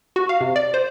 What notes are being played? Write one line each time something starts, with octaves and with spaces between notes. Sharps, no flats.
F#4
F5
C3
D5
C5